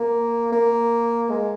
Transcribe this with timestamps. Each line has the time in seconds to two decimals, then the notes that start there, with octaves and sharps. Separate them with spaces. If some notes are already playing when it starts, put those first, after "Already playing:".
Already playing: A#3
0.52 A#3
1.30 G#3